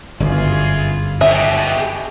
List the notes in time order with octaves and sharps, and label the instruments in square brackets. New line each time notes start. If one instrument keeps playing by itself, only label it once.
[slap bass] G1 F#2 [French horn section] E3 F4 G#4
[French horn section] B2 [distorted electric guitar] G4 G#4 [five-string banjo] E5